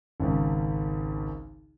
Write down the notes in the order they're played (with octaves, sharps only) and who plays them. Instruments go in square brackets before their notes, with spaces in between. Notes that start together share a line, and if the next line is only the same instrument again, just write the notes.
[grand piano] G#1 C#2